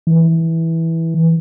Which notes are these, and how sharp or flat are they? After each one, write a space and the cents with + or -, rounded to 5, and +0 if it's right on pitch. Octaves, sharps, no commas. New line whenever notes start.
E3 -10